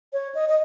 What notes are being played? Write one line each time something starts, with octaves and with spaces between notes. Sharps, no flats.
C#5
D#5
D#5